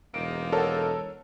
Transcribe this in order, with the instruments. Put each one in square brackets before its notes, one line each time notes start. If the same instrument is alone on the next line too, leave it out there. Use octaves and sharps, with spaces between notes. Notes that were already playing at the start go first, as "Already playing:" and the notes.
[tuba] E1 [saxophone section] G#2 D#3 A#3 [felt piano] D7
[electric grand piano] A4 A#4 A5 [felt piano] C#5 F#5